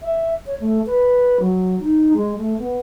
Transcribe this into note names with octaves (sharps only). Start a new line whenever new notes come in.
E5
C#5
A3
B4
F#3
D#4
G#3
A3
B3